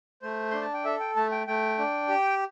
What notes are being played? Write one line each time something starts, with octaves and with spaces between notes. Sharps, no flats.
A3 C5
D4 C6
A5
G5
A4 E5
G5
A3 A5
G5
A3 G5
D4
G4